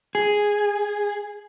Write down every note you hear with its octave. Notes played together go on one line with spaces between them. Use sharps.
G#4